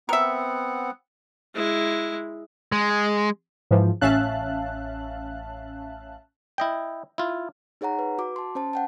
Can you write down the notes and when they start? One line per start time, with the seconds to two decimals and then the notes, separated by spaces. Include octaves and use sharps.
0.09 B3 C4 A#4 E5 F#5
1.55 G#3 E4
2.72 G#3
3.71 G#2 E3 F3
4.01 A1 C#4 E5 F5 A5 F#6
6.58 E4 D#5 G5
7.18 E4 F4
7.81 D#4 G#4 C#5 F#5 A#5
7.99 B4
8.18 F#4 D6
8.36 A5 C6
8.55 C#4 C5 A5
8.73 F#5 G5 A5